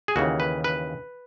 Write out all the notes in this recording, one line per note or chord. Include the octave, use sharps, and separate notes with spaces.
G#4
D#2 C#3 E3 F#4
B4
B4